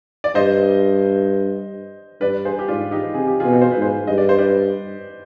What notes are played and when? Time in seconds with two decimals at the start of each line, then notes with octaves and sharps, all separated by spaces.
0.24 D5
0.35 G2 C5 D#5
2.21 G2 B4 D5
2.45 G#4 C5
2.59 G4
2.68 G#2 D4 F4
2.91 D#4 G4
3.14 C3 G#4
3.27 G4
3.40 F4 G#4
3.45 B2
3.61 C5
3.71 B4
3.77 G#2
3.82 G#4 C5
4.07 G2 D#5
4.18 D5
4.29 C5
4.38 B4 D5